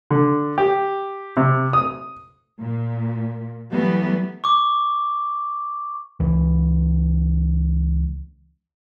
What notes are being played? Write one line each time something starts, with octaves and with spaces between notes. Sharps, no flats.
D3
G4
C3
D#6
A#2
E3 F#3 G3 A3 B3
C#6 D6
C#2 E3